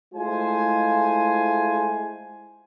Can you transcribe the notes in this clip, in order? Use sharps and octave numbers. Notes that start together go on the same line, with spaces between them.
G#3 A3 E4 F4 C5 G#5